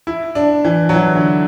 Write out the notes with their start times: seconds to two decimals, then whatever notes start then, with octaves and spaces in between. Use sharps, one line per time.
0.07 E4
0.35 D4
0.65 E3
0.89 F#3
0.94 E3
1.15 D3